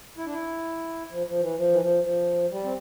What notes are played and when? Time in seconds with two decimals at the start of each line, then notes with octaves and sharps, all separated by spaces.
0.17 E4
0.26 D4
0.34 E4
1.11 F3
1.27 F3
1.42 E3
1.57 F3
1.72 E3
1.81 F3
2.04 F3
2.51 G3
2.64 C4